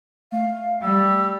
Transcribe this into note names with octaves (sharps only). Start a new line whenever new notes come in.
A3 F5
G3 E6